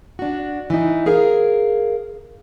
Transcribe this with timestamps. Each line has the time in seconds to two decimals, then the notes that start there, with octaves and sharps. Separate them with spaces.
0.19 D4 F#4
0.70 E3 D#4
1.06 G#4 A#4 F5